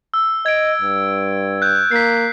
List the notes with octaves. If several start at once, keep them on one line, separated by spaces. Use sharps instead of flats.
E6
D#5 G#6 D7
G2
F#6 G6
A#3 B6 C7